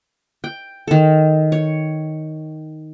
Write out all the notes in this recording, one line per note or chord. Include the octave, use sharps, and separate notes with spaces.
G5
D#3 A4
C#5